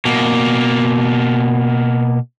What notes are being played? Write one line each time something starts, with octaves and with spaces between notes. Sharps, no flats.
B2 A#3